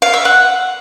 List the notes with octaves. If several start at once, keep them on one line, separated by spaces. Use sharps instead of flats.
F5
E5
F#5